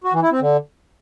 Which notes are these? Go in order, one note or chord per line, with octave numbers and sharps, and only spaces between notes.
F#4
E3
E4
C4
D3